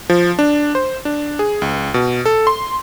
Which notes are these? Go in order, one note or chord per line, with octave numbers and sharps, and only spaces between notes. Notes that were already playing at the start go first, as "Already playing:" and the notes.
F3
D4
C5
D4
G#4
C#2
B2
A4
C6